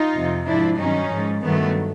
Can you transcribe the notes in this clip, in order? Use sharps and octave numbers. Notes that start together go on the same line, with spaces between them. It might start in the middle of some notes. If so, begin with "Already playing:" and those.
Already playing: D#4 F4
F2 C3 F3
G#2 F3 D4 E4
G2 D#3 F#3 C#4 D#4
G#2 F3
G2 D#3 F#3 A3 B3